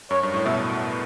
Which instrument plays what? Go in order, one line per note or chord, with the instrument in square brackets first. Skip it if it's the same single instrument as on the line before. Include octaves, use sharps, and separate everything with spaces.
[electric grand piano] F#2 [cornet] C#5
[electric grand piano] G2
A2
[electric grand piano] B2 [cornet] E5